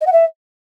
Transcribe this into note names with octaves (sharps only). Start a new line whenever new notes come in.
D#5
F#5
E5